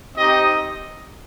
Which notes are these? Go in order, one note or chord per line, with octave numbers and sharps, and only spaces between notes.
C4 D#4 G4 D#5